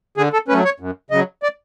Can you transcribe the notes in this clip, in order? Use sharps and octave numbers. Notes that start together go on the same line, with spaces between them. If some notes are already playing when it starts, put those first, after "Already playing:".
D3 G#4
A4
F#3 A3 C#4 B4
C#5
F#2
C#3 F#3 D#5
D5